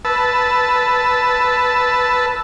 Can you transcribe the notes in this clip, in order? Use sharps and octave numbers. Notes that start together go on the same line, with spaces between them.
B4 A5 E6